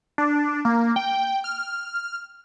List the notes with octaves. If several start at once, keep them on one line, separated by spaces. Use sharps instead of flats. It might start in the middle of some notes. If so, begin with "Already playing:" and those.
D4
A#3
G5
F6